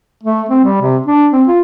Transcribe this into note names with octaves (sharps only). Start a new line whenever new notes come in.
A3
C4
G3
C3
D4
C4
F4